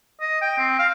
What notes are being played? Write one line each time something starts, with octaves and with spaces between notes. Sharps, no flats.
D#5
G5
C4
F5